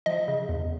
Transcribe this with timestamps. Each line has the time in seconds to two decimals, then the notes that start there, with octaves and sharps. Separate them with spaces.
0.06 F3 D#5
0.28 C#3
0.49 E2